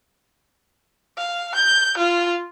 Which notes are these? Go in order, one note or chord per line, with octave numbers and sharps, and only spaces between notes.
F5
G6
F4